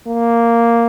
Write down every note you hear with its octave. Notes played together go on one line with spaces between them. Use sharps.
A#3